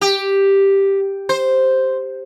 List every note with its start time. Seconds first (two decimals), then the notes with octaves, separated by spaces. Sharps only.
0.01 G4
1.29 C5